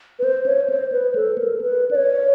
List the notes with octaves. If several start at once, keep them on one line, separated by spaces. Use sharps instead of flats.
B4
C5
C#5
C5
B4
A4
A#4
B4
D5
C#5